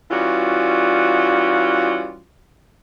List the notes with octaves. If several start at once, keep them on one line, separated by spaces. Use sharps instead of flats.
E3 G3 C#4 F4 F#4